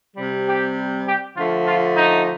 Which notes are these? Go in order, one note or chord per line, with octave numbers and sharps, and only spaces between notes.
C3 G3
G4
G4
D3 F3 A3 F4
F4
D#4